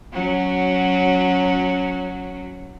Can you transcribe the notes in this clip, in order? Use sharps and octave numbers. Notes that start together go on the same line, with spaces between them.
F#3 C#4 F#4